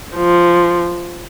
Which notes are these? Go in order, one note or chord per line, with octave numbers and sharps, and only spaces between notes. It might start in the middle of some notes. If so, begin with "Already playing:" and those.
F3